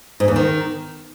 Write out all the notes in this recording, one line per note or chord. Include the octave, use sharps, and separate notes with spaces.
G#2
E2
D#3